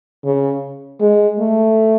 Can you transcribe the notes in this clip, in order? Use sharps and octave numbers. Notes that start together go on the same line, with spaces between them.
C#3
G#3
A3